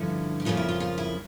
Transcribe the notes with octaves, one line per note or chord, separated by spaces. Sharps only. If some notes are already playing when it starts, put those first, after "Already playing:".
Already playing: G2 D3 F3 C#4 E4
G4
F2 C#3 F3 A#3 C#4 F4
E4
F4
F4
E4